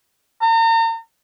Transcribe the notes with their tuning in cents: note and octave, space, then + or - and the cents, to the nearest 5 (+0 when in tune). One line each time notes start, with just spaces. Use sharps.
A#5 -40